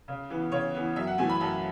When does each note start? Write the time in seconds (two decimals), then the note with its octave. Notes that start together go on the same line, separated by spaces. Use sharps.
0.08 C#3
0.30 E3 B3
0.52 C#3 C#5
0.75 E3 B3
0.96 F#2 E5
1.07 F#5
1.18 E3 A3 G#5
1.30 B5
1.40 F#2 A5